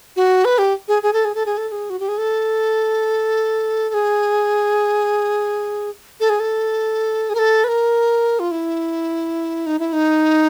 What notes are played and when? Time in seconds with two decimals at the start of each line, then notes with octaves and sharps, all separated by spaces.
0.16 F#4
0.45 B4
0.58 G4
0.88 G#4
1.03 G#4
1.13 A4
1.25 G#4
1.35 A4
1.46 G#4
1.58 A4
1.69 A4
1.72 G#4
1.90 F#4
2.00 G4
2.08 G#4
2.18 A4
3.89 A4
3.94 G#4
6.20 A4
6.29 G#4
6.40 A4
7.29 G#4
7.35 A#4
7.39 A4
7.64 B4
7.68 A#4
8.39 F4
8.51 E4
9.66 D#4
9.79 E4
9.93 D#4